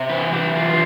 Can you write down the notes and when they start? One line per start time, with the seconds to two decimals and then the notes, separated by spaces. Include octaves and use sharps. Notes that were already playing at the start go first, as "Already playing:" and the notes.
Already playing: C3
0.09 E3 B4
0.32 E3 G4
0.56 C3 F4